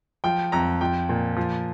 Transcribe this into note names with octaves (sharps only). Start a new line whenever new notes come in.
F3 G5
F2 A#5
F3 G5
A#2
F3